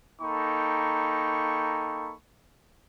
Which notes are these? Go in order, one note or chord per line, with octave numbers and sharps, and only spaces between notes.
A#3 D#4 A4 G5 B5 C#6